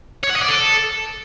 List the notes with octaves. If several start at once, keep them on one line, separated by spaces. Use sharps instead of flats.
C#5
F#5
D#5
D5
A4